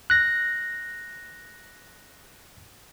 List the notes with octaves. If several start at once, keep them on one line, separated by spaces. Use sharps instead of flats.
F#6 A#6